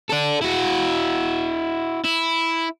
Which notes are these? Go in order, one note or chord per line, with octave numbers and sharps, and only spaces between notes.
A4 D5
E4 F#4
E4